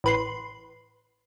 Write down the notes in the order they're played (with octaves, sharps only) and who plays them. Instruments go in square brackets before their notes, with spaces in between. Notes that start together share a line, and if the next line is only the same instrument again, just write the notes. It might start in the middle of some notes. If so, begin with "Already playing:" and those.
[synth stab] A1 B4 C6